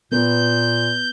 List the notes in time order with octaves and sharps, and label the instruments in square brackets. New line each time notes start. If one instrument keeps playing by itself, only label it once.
[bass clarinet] A#2 [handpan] B3 A#4 B4 [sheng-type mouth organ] G6